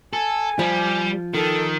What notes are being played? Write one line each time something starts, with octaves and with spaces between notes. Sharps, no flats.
A4 G#5
F3 G3
D#3 A4